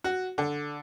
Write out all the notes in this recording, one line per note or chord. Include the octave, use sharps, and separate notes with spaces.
F#4
D3